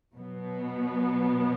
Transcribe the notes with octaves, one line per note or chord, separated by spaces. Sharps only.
B2 F#3 B3